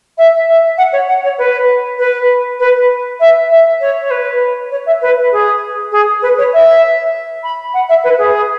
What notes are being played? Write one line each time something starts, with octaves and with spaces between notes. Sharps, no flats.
E5
E5
F#5
C#5
F#5
C#5
B4
B4
B4
E5
E5
C#5
C#5
B4
C#5
E5
B4
G#4
G#4
B4
C#5
E5
B5
F#5
E5
B4
G#4